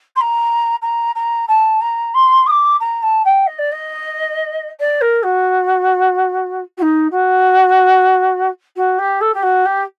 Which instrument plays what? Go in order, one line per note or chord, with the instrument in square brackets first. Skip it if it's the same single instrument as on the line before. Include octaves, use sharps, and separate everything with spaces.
[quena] C6
A#5
A#5
A#5
A5
A#5
C6
D#6
D6
A#5
A5
G5
D#5
D5
D#5
D5
A#4
F#4
F#4
D#4
F#4
F#4
G4
A4
G4
F#4
G4